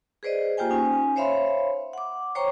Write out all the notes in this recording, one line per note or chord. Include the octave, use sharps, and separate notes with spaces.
G#4 B4 C5 D5 D#5
A#3 F4 G4 C5 G5 G#5
C#4 D#4 G#5
C5 C#5 E5 F5 B5 C6
F#5 D6
C5 C#5 G5 A#5 C#6